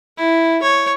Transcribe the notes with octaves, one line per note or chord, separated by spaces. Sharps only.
E4
C#5